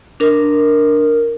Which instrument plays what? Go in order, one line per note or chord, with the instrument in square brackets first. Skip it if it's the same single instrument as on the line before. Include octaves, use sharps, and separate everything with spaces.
[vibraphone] D4 A#4